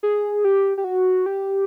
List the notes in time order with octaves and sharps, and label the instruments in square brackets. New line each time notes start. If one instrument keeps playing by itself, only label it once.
[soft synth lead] G#4
G4
G4
F#4
G4